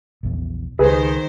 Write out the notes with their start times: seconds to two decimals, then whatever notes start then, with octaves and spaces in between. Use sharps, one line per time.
0.23 A#1 E2
0.79 C#2 D#3 G#4 B4 C5